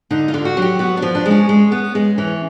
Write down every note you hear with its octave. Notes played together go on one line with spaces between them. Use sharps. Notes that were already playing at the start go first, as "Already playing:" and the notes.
D3 D#4
F4
D3
F#4
F#3
G4
B3 F#4
D4
F3
D4
G#3
C#4
G#3
B3
G#3
E3 C#4